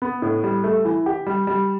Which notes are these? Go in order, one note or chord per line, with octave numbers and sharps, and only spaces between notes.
B3
A2
G3
A3
E3
G4
G3
G3